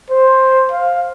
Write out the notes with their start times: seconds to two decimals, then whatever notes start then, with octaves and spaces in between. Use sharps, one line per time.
0.10 C5
0.72 F5